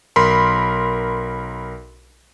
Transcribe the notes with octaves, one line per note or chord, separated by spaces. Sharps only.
B1 A#4 B5 C6